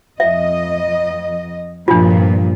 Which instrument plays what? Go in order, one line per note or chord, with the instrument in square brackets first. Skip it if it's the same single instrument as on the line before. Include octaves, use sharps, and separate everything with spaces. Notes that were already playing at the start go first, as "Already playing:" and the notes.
[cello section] F2 D#5 [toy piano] E5
[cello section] G2 A#2 F3 [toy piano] D4 F4